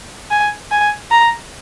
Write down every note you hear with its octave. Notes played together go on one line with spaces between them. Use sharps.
G#5
G#5
A#5